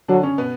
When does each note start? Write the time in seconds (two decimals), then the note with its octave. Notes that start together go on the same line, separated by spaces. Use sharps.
0.08 D3 F#3 D4
0.23 C#3 C#4
0.38 B2 B3